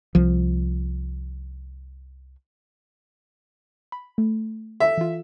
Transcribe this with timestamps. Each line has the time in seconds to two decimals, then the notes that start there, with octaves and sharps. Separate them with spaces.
0.15 C2 F3
3.92 B5
4.18 A3
4.80 A4 E5
4.98 E3 F4